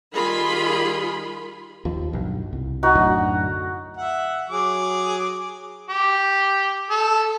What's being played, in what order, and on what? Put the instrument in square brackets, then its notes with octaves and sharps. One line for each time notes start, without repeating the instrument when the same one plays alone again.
[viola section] D#3 G3 F4 G#4 B5 C6
[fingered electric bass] D#2 F3
B1 G2
C2
[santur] D#4 F#4
[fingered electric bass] F#2 A2 D3
[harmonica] E5 F#5
F#3 G#4 D6
G4
A4